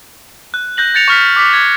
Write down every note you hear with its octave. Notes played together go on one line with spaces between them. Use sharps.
F#6
F#6 G6 A#6 F#7
G6 A6 C#7 F7
C#6 F6 B6
D6 B6
G#6